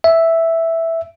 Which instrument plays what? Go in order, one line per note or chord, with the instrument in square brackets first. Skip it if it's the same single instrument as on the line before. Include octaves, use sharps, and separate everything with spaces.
[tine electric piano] E5